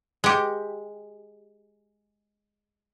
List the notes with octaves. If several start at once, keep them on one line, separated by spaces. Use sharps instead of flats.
G#3 G4